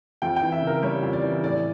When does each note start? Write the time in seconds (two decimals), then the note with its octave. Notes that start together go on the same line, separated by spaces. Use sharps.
0.22 F2 G5
0.36 G5
0.42 E3
0.52 E5
0.62 C#3
0.67 A#4
0.82 G3 C#5
1.03 F2
1.13 D5
1.23 E3
1.43 A2 D5